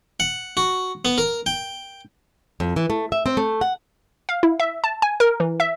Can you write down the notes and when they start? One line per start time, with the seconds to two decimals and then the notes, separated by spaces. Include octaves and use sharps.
0.20 F#5
0.57 F#4
1.05 B3
1.18 A#4
1.46 G5
2.60 F2
2.76 E3
2.90 A3
3.12 E5
3.26 C4
3.37 A3
3.61 F#5
4.29 F5
4.43 E4
4.60 E5
4.84 A5
5.02 G#5
5.20 A#4
5.40 E3
5.60 E5